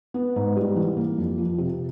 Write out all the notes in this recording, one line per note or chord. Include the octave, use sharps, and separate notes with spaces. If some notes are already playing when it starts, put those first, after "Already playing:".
B3
G#2
G3
E3
A#3
F2
F3
C3